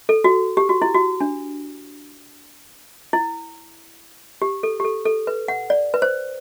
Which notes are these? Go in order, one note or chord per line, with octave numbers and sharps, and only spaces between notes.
A4
F#4
G4
F#4
E4
F#4
D4
E4
G4
A4
G4
A4
A4
B4
F#5
D5
B4
C5